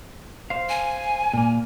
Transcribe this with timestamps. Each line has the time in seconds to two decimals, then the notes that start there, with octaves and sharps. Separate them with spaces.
0.50 C5 F5
0.69 G#5
1.34 A#2 A#3